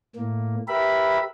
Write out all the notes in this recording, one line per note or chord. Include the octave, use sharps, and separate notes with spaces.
A2 A#3
G4 A#4 B4 E5 B5